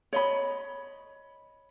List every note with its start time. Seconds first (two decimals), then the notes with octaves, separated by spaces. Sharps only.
0.13 C#5 D#5 B5